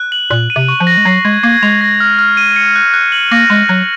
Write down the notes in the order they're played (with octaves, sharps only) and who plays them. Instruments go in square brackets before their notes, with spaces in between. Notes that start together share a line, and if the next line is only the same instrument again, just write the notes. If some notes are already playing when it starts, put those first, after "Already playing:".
Already playing: [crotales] F#6
F#7
[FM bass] A#2 [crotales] F#6
[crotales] D#7
[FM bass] C3
[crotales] C#6
[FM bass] F3
[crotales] A#6
[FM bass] G#3
[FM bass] F#3 [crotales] C7
[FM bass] G#3 [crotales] G#6
[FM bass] A#3 [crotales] G#6
[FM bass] G#3 [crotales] F7
[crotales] A#6
F6
F6
D#7
C#7
F#6
F#6
F#7
[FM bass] A#3 [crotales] A#6
[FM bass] G#3 [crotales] F#6
[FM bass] F#3 [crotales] F#6